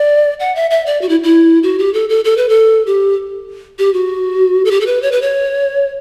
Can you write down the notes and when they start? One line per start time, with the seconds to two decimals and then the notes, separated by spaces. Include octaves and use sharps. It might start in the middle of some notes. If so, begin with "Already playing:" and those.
Already playing: D5
0.40 F#5
0.55 E5
0.71 E5
0.86 D5
1.02 F#4
1.09 E4
1.23 E4
1.63 F#4
1.79 G4
1.94 A4
2.09 A4
2.25 A4
2.37 B4
2.49 A4
2.87 G4
3.79 G4
3.94 F#4
4.65 A4
4.71 G4
4.81 A4
4.86 B4
5.02 C#5
5.12 B4
5.22 C#5